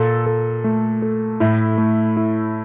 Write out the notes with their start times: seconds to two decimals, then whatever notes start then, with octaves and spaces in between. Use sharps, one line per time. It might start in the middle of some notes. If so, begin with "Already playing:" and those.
Already playing: A#2 A4
0.26 A4
0.64 A3
1.02 A4
1.40 A2 E4
1.78 A3
2.17 E4